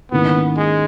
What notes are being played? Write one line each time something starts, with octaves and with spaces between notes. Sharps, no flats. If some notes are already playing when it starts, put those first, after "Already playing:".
G#2 D#3 A#3 B3 C#4 E4
G#3